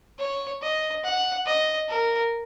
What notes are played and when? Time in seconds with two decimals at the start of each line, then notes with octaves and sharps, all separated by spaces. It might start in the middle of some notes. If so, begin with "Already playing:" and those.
0.19 C#5
0.62 D#5
1.04 F#5
1.46 D#5
1.89 A#4